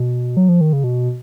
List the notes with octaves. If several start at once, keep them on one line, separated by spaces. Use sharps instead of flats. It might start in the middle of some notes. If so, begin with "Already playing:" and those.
Already playing: B2
F#3
F3
D#3
C#3
B2